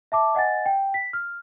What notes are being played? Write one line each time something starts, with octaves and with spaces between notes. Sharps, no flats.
E5 A5 D6
D#5 F#5 G#5 A6
G5
B6
F6